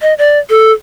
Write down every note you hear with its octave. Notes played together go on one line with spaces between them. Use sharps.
D#5
D5
A4